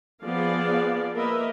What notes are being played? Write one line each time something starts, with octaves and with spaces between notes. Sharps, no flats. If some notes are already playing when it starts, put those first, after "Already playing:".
F3 B3 G#4 D5 F5
A#3 A#4 B4 D#5 E5